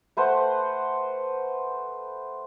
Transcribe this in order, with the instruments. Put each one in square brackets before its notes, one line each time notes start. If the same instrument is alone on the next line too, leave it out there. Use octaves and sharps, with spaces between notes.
[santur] A3 B4 C5 F#5